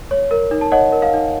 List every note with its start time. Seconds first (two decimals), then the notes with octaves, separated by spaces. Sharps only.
0.11 C#5
0.31 A#4
0.51 D#4
0.61 A5
0.72 C#5 D#5 F#5
0.92 A#4
1.02 F5
1.13 D#4